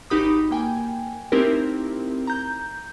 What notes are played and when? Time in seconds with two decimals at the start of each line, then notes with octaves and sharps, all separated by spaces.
0.10 G#1 D#4 F#4 G4 B5 D#6
0.51 A#3 G5 G#5
1.32 A3 C4 D#4 E4 G4 A#4
2.27 A#5 G6